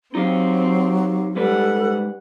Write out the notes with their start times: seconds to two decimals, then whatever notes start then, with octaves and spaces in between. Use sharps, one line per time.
0.15 F#3 C4 D#4 G4 F5
1.36 G#2 G3 A4 B4 F#5